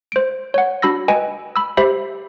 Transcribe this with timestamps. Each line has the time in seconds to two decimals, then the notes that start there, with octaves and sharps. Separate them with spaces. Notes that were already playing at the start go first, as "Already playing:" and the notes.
0.12 C5 D7
0.54 C#5 F#5
0.82 D4 F#4 B5 E6 A#6
1.08 B4 D#5 G5 G#5
1.56 B5 E6
1.77 G4 C5 E5 B5